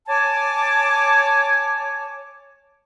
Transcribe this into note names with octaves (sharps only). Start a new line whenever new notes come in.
C#5 G#5 A5 D6